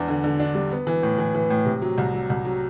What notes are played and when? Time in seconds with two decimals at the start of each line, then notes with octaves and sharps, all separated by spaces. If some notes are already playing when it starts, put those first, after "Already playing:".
Already playing: E2 D4
0.08 D3
0.24 D3
0.40 D4
0.55 G3
0.71 B3
0.87 E3
1.03 A2
1.18 E3
1.34 E3
1.50 A2
1.66 C3
1.82 F#3
1.98 C2
2.14 F#3
2.30 C2
2.45 F#3